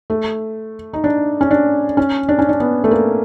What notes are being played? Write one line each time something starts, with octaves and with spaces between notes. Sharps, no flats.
A3
D#4
D4
C#4
D4
C#4
D4
C#4
D4
B3
A3
A#3